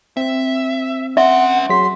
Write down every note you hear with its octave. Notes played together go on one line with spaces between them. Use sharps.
C4 E5
C#4 E5 F#5 C6
F#3 G#4 C6 B6